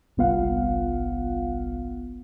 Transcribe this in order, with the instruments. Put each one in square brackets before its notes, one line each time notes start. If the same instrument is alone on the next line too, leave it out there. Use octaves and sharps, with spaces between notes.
[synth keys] G1 C2 B3 F4 F5 F#5